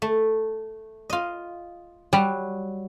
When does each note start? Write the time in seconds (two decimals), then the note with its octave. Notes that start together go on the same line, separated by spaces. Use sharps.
0.02 A3
1.10 F4 D#5
2.13 F#3 G3